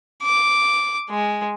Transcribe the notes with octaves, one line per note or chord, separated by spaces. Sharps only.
D6
G#3